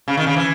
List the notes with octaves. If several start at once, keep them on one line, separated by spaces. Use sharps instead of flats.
C#3
D#3
C#3
E3